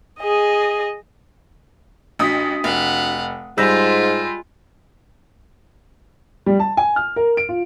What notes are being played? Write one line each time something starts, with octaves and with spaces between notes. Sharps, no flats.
G#4 D#5
A1 D4 F#4 D#6 B6
F1 F5 F#5
G#2 G3 G#3 F4 E6 G6 A#6
G3
A5
G#5
F6
A#4
D7
F4